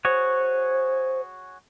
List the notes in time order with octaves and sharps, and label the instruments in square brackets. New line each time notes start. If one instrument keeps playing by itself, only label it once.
[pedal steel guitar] F#4 G#4 C#5 [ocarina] C5